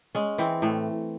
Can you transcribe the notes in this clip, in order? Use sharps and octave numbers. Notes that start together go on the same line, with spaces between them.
G#3 C#4
E3 C4
A2 A3